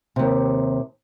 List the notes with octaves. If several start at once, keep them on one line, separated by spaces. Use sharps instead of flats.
D#2 C3